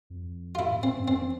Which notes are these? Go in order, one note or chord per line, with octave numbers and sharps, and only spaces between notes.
F2
F4
A2 E4
A#2
A2 C4
G2
F2 C4